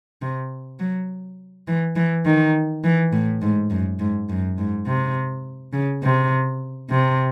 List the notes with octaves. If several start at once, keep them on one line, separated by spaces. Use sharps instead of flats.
C3
F#3
E3
E3
D#3
E3
A2
G#2
F#2
G#2
F#2
G#2
C3
C#3
C3
C3